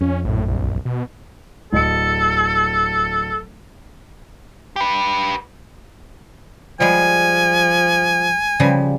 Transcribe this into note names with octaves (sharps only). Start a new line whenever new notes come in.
F2 C#4
A#1 F#2 A2
C2
B2
D1 A4 D#5 C#7
G4 B4
F3 G3 G#3 G#5
C#3 F3 G3